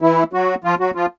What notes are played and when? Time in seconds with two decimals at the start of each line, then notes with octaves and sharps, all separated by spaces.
0.01 E3 E4
0.33 F#3 F#4
0.64 F3 F4
0.80 F#3 F#4
0.95 F3 F4